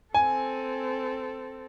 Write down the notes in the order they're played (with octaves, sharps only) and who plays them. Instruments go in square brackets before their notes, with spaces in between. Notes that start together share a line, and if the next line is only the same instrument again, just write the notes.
[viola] C4 A4 [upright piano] G#5